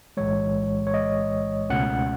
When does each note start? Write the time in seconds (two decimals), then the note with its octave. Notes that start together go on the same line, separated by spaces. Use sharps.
0.17 B1 A2 E3 G#3 C#5
0.87 C#5
0.94 D#5
1.70 C#2 B2 A3 C#4 F#5